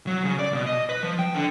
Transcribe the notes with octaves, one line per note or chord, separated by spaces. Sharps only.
F#3
C#3
D5
B2
D#5
B4
F3
G5
D3